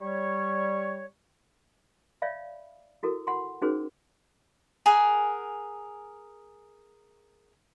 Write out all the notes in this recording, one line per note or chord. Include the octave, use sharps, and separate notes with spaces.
G3 C#5
C#5 D5 E5 F5 B5
E4 F#4 A4 A#4
F#5 B5 C6
C#4 D#4 F#4 G#4 A#4 C5
G#4 A#4 F#5 G#5